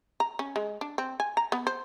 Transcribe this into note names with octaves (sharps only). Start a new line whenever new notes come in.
A#5
C#4
G#3
D4
C4
G#5
A#5
B3
C5